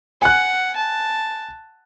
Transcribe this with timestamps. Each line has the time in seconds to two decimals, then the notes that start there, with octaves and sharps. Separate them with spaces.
0.22 F#5 G#5 F#6
0.76 A5